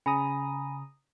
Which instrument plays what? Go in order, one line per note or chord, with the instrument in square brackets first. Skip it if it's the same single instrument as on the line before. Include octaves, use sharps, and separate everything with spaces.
[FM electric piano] C#3 A#5 D#6 [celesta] G#5 B5